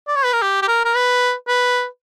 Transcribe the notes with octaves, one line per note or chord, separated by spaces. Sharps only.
D5
C#5
B4
A#4
G4
G4
A#4
A#4
B4
B4